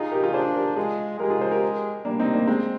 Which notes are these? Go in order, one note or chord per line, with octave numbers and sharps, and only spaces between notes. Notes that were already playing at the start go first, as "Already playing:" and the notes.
Already playing: D#4 F4 G#4
G4 A#4
F4 G#4
D4 G#4 C5
G4 A#4
G#3 F4 G#4
G#3 G4 A#4
F4 G#4
G#4 C5
G4 A#4
G3 A#3 D4
C4 D#4
A#3 D4
G#3 C4